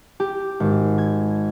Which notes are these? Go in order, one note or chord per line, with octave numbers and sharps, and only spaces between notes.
G4
G#1
G#6